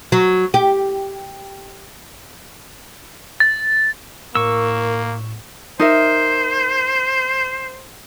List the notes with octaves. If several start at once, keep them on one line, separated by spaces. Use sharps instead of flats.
F#3
G4
A6
A2 A#3 A#4 C#6 E6
D#4 A#4 C5 E5